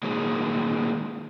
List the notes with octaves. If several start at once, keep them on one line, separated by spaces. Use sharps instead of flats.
A#2 D#3 F#3 G#3